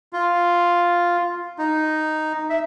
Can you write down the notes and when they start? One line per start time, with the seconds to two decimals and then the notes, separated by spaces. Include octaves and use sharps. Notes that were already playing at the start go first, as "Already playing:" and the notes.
0.13 F4
1.58 D#4
2.50 E5